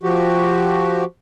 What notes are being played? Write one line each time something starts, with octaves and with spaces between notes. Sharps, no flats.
F3 F#4 G4